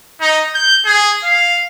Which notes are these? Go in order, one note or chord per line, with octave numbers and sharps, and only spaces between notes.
D#4
G6
G#4
F5